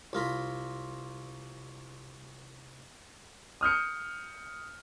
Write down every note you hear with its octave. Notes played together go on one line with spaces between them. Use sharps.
C2 F4 A#5 B5
D#6 F6 G6 C#7